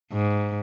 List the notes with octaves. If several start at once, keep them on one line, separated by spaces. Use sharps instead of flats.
G#2